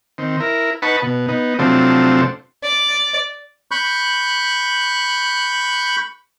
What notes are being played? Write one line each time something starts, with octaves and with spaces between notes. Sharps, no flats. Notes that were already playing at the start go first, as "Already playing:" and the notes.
D#3 C4
E4 A#4
D#4 B4 F#5 A5 B5 C#6
B2
B3 D#4
C3 F3 F#3 A3 C4 D4
D5
B5 C#6 F#6 G6